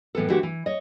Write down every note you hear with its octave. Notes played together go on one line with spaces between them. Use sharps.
A2 E3 B3 A4
D3 E3 A3 F#4 G4 A4
E3
C#5 D#5